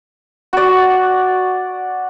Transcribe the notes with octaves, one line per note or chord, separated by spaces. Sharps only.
F#4 D5